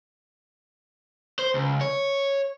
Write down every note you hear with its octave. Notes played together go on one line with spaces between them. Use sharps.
C5
C#2
C#5